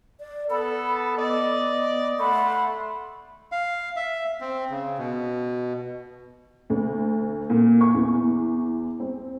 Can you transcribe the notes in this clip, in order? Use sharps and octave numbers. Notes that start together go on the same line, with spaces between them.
D5
B3 A4 B5
B3 D5 D#5
A3 F#5 B5 C6
F5
E5
C4
C#3
B2
D2
A#2
C#6
E2
C4